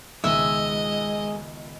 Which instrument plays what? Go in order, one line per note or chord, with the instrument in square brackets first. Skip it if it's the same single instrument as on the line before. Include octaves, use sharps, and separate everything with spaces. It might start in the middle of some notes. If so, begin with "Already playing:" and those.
[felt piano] C#2 B2 D#3 [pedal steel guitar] G#3 [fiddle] D#5 [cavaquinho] E5